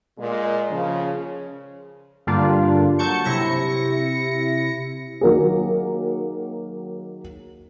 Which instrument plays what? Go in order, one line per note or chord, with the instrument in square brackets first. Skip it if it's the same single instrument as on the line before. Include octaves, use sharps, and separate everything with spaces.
[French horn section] A#2 G#3
C#3 F3
[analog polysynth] G2 D3 G3 A#3 D4 F4
F#3 A5 C#6 G6 C#7
C3 E4 A#6 C#7
[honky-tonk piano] D#3 F#3 A#3 G#4